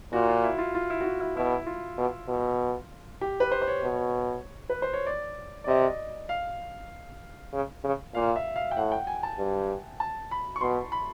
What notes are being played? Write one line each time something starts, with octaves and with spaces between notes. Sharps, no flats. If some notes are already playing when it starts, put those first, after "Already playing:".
A#2 F#4
F4
E4
F4
F4
E4
F#4
F4
E4
B2 E4
F4
B2
B2
G4
B4
C5
C5
C#5
B2
B4
C5
C#5
D5
D5
C3 D#5
F5
C#3
C#3
A#2 F5
E5
F5
G5
A2 F#5
G5
G#5
A5
G2
A5
B5
C#6
B2 C6
B5